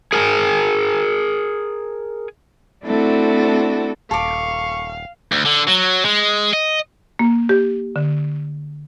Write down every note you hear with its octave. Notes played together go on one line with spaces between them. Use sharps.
G#4 A#4 G#5
A3 C4 D4 E4 F#4 A4
D#1 A4 F5 C#6 D6
D2
D3
F#3
G#3
D#5
A#3
G4
D3